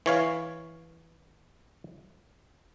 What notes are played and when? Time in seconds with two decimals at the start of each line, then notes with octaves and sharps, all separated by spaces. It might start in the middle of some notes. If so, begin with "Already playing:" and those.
0.06 E3 C#5 F5